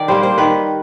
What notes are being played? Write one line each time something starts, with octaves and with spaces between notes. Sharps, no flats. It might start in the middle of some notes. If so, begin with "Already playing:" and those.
Already playing: D#3 D5
G3 A#3 C5
C5
D#3 B4